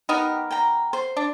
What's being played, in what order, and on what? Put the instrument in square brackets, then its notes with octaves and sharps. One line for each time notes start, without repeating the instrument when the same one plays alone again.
[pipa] B3 D#4 A#4 [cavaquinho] G4
[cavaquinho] G5 A#5
C5
[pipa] D4